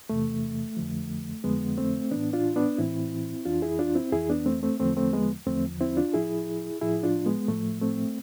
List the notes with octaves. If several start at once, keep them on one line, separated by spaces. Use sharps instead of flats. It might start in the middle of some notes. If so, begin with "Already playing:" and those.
E2 C3 E3 A3
F2 D3 F3
F2 D3 F3 G#3 B3
A3 C4
A2 E3 B3 D4
D4 F4
B3 D4
A2 E3 C4 E4
F2 E3 D4 F4
E4 G#4
D4 F4
C4 E4
F2 E3 E4 G#4
B3 D4
A3 C4
A3 C4
E2 D3 F3 A3 C4
A3 C4
G#3 B3
E2 D3 F3 A3 C4
C4 E4
D4 F4
A2 F3 E4 G#4
A2 F3 E4 G#4
D4 F4
G#3 B3
A2 F3 A3
A3 C4